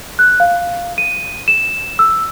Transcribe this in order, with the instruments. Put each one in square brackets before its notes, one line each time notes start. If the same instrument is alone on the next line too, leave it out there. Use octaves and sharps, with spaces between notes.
[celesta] F#6
F5
D#7
E7
E6